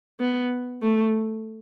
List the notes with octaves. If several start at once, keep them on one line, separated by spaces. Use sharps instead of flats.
B3
A3